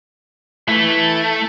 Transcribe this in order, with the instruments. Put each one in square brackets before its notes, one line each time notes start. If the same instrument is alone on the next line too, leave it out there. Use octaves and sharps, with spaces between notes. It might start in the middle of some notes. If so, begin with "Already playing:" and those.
[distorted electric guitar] A3 [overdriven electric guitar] E4 B4